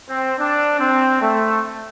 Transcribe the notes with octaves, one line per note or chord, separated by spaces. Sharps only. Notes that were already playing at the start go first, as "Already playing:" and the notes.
C4
D4
C4
A3